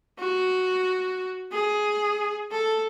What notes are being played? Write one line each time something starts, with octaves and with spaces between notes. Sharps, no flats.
F#4
G#4
A4